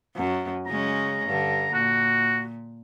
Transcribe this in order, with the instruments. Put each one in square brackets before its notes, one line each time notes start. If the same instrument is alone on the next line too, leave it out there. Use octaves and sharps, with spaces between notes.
[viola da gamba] F#2
[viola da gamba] C#3 G#3 C#4 [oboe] A#5
[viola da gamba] G2 D3
[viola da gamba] A#2 [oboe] F#4